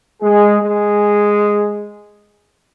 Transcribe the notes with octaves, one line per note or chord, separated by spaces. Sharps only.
G#3 G#4
G#3 G#4